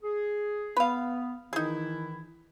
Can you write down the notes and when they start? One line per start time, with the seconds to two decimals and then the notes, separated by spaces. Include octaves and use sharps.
0.02 G#4
0.76 B3 B4 F5
1.53 D#3 E3 D#4 E4 G#4